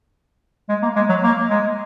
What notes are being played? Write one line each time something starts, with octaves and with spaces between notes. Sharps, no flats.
G#3
A#3
G#3
F#3
A#3
G#3